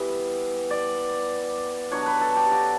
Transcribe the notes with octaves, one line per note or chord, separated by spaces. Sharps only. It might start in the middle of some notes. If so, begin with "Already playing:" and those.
Already playing: E3 G3 B3 E5
D5
B2 F#3 B3 D4 C#5
B4
A4
G4
F#4